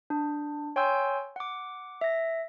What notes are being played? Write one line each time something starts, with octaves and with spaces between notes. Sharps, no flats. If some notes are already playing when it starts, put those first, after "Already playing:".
D4
C#5 G5 G#5 C6 E6 G6
F#5 D6
E5 A#6